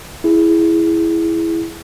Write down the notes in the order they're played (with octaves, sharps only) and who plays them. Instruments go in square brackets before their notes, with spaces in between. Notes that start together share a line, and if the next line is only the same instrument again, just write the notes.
[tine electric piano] E4 G#4